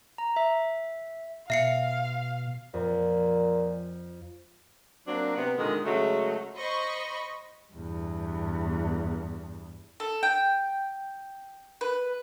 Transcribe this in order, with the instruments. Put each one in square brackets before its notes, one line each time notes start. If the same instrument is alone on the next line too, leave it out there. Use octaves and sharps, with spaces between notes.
[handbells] A#5
E5
[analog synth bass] B2 [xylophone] E5 C7 C#7 [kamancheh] F5
[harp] F2 [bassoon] A#2
[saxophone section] F#3 A#3 C4 D4
C3 B3
A#2 D3 D#3 G#3
C#3 F#3 G#3 A3
[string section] C5 D#5 B5 C#6
[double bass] E2 G2
[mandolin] A4
G5
B4